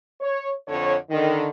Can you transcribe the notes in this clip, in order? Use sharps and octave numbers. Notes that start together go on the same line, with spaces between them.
C#5
F2 D3 C#5
D3 D#3